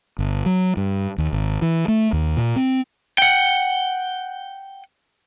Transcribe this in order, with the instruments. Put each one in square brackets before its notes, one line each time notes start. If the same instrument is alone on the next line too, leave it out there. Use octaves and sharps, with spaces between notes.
[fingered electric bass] G1
F#3
G2
D#2
G#1
E3
A3
D#2
A#2
C4
[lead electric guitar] F#5 G5